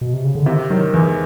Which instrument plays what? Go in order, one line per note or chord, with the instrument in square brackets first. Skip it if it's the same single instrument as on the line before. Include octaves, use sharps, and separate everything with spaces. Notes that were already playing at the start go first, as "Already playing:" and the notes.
[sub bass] B2
C3
C#3
D3
[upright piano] C3 [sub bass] D#3
[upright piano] D#3 [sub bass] F#3
[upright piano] E2 [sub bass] E3